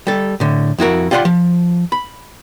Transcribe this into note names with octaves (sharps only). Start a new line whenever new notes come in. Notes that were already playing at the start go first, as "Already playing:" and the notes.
G3 A4
A2 D3
F2 E4 F#4 A#4
F4 G4 D5 F5 F#5 C6
F3
B5